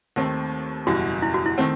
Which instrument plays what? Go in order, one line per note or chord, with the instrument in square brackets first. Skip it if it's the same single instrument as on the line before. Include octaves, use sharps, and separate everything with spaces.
[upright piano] D#2 D#3 A3 C4
[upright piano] F#1 E2 B2 G3 [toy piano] F#4
[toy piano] E4
F#4
E4
[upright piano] D#3 A3 C4